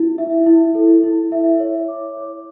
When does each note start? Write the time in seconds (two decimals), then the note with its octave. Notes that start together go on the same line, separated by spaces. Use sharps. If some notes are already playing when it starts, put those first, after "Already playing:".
Already playing: E4
0.18 E5
0.47 E4
0.75 A4
1.03 E4
1.32 E5
1.60 C#5
1.88 D6
2.17 C#5